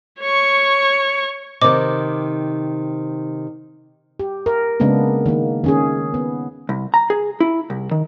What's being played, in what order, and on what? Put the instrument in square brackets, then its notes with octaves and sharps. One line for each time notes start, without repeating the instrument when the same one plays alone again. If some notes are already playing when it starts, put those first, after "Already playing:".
[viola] C#5 C#6
[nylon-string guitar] C3 D#3 [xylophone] D#5 D6
[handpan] G4
A#4
C#3 G#3 A#3 B3 D4
D#3 A#3
D#3 C#4 G#4
B3
[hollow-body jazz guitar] C2
A#5
G#4
E4
C2
D#3